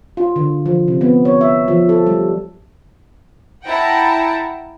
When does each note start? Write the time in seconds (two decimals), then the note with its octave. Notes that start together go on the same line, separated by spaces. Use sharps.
0.17 F4
0.36 D3
0.66 F3
0.88 C3
1.01 B3
1.25 C#5
1.41 E5
1.68 F3
1.89 A4
2.07 G3
3.65 E4 F#5 G5 A5 A#5